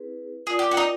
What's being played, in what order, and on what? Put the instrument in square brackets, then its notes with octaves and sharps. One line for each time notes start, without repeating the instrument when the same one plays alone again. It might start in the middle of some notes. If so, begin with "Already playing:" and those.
Already playing: [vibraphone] C4 E4 G#4 B4
[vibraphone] F4 A#4 D5 [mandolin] G#4
[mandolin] G4
F#4
D#4